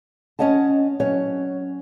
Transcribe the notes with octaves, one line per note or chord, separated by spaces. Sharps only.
C#4 C#5 D#5 F#5 A5
F#3 C#4 C#5